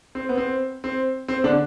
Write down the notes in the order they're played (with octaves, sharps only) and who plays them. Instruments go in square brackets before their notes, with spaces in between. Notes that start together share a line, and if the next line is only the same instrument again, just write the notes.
[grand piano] C4
B3
C4
C4
C4
D3 D4